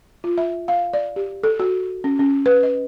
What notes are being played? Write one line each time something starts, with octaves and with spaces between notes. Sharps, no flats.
F4
E5
F5
D5
G4
A4
F#4
C#4
C#4
B4
D#5